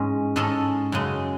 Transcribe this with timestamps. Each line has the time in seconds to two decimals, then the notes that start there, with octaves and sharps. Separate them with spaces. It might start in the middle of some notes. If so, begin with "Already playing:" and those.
Already playing: G#2 E3 G#3 C#4
0.36 G#2 G#3 C#4 A4
0.92 F#2 C#3 G#3